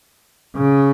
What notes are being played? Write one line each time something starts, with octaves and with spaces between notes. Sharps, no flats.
C#3